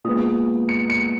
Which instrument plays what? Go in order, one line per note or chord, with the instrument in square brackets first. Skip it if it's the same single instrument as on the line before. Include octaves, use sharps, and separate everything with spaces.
[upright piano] A#2 G#3 B3 D#6
C#7
C#7